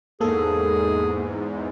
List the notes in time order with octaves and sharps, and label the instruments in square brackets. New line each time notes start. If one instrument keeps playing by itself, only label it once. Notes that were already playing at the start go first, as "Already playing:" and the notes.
[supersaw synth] E2 G#2 [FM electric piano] A#3 A4 [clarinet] G#4